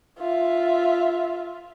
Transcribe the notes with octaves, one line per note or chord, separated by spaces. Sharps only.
F4 E5